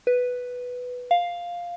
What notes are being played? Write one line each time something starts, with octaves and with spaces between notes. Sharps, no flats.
B4
F5